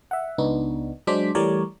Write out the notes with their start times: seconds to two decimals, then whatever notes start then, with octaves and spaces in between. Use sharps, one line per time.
0.11 E5 F#5
0.38 C#2 B3 D4 D#4
1.07 F#3 G#3 D4 C5 D6 B6
1.35 E3 G3 A3 A#4 C#5 D5